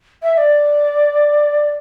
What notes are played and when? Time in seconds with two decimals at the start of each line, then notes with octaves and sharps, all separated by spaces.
0.23 E5
0.34 E5
0.37 D5